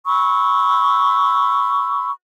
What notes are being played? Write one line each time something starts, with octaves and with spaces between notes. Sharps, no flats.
B5 C#6 E6